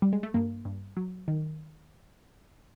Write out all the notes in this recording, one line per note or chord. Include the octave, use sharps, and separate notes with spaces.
G3
G#3
A3
G2 A#3
G2
F#3
D#3